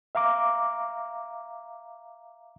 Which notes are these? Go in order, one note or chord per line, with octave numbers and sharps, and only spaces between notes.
E5 F5 A#5 D6